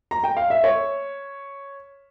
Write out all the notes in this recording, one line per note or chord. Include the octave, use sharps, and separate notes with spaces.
A#5
G5
F5
E5
C#5